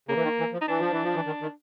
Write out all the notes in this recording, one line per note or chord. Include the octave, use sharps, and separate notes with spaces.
C#3 A#3
E3
D#3
E3
F3
D#4
E3 D4
F3
E3
F3
E3
D#3
D#3